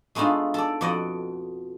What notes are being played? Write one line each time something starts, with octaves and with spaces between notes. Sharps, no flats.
G#3 A3 B3 D4 D#4 F4
A4 D5
F2 B2 D5 D#5 F#5